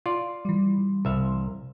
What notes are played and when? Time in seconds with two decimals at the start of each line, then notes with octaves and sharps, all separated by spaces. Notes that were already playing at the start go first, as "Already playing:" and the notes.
0.06 F4 D5 C6
0.45 E3 G3
1.05 C2 E5 F5